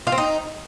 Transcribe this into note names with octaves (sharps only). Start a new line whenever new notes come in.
F4
C4
D#4